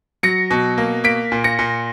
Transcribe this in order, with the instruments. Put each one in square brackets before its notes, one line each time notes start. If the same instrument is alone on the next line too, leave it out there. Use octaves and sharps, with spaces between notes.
[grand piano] F#3 A#6 C#7
B2
A#3
A#3 B6 D7
A#2
A#6 C#7
A#2